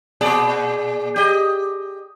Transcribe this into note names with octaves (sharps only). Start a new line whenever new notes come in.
A#2 G#4 D5
G4 D#5